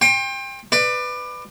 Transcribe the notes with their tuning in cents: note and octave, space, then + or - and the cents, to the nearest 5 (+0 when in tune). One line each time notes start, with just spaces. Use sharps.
G5 +25 C6 +40
B4 +10 D5 +25